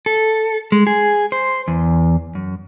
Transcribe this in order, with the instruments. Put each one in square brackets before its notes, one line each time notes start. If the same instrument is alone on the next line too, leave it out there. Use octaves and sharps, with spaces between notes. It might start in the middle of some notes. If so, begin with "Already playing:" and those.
[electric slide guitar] A4
G#3
G#4
C5
E2
F#2